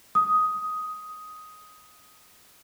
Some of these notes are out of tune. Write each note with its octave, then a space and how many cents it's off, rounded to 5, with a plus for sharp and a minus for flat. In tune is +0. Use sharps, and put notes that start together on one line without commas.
D#6 +10